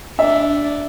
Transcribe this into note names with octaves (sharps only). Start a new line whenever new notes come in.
D4 E5